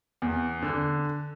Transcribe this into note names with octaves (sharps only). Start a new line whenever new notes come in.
E2
D3